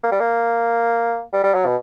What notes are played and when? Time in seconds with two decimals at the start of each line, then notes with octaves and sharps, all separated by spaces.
0.04 A#3
0.11 G3
0.20 A#3
1.33 G3
1.44 G3
1.54 F#3
1.66 B2